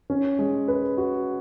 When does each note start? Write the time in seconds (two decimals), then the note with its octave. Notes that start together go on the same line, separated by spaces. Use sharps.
0.10 C#4
0.39 G#3
0.68 B4
0.98 F#4